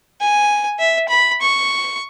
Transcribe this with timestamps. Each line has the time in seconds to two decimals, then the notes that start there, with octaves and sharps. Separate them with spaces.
0.20 G#5
0.79 E5
1.09 B5
1.41 C#6